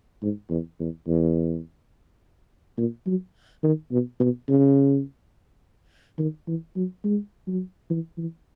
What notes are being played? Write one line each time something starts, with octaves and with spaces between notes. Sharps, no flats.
G#2
E2
E2
E2
A#2
F#3
D#3
B2
B2
C#3
D#3
E3
F#3
G#3
F#3
E3
E3